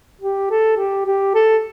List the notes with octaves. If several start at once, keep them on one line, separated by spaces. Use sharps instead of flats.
G4
A4
G4
G4
A4